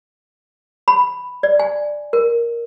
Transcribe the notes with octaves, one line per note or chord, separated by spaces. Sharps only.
B5
D5
G#5
A#4